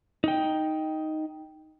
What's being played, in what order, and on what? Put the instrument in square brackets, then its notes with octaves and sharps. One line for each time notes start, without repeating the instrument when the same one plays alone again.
[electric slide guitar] D#4 G5